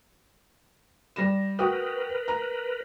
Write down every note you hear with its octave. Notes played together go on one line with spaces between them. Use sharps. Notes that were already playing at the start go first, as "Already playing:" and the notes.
G3 A#6 E7
F#4 A#4 B4 G5 D#6
A#5